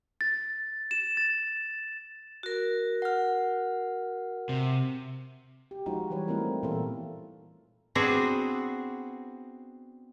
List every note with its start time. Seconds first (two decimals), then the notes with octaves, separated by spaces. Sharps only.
0.21 A6
0.91 E7
1.17 A6
2.43 F#4 A#4
3.02 F#5 F6
4.49 C3
5.71 G4
5.86 F3 G#3 D#4 F4 F#4
6.10 E3 G3 B4 C#5
6.28 G3 A3 A#3 C4 E4 A#4
6.63 A#2 E3 B3 F4 A4 A#4
7.95 B3 C4 D4 F#4 G#4 C5